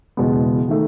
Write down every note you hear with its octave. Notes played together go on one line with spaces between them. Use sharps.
F#1 E2 B2 G#3 B3
D#3 A3